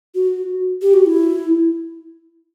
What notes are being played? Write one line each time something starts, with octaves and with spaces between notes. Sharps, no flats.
F#4
G4
F#4
E4